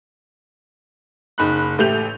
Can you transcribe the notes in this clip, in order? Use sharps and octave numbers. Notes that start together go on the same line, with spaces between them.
F#1 D#4 B5 F#6
A1 A3 G4 G6 F7